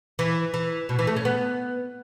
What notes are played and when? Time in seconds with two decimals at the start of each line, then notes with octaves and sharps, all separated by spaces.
0.19 E3
0.54 E3
0.89 B2
0.99 E3
1.07 A3
1.16 C#4
1.25 B3